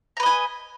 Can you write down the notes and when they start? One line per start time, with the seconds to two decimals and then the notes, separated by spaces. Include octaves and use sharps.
0.17 A#5
0.20 B4
0.23 D#5
0.26 G#5